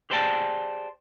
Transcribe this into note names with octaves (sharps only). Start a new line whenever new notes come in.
G4 G#4 C5 D5 G5 A5